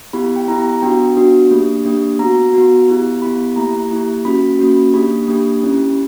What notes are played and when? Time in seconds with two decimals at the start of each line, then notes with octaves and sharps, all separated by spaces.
0.13 B3 E4 G4 B5
0.36 G5
0.48 B3 E4 G4 A#5
0.71 A#5
0.82 B3 D4 F#4 G5
1.16 B3 D4 F#4
1.51 A#3 D4 G4
1.85 A#3 D4 G4
2.19 B3 F#4 A#5
2.54 B3 F#4
2.88 B3 E4 G4
3.22 B3 E4 G4 B5
3.56 A#3 E4 G4 A#5
3.91 A#3 E4 G4
4.25 A#3 C#4 F#4 B5
4.59 A#3 C#4 F#4
4.94 A#3 D4 G4 B5
5.28 A#3 D4 G4
5.63 C#4 E4 G4